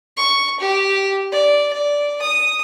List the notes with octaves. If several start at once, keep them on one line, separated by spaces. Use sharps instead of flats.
C#6
G4
D5
D5
D#6